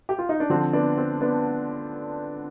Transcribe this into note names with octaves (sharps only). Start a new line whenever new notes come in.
G4
F4
D#4
D4
D3 F3 C4
B3 D4
C4
B3 D4